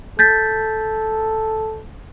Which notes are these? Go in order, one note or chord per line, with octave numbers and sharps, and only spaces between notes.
A4 G6 A6 B6